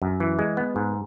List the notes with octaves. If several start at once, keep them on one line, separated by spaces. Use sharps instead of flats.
F#2
E3
G#3
B3
G#2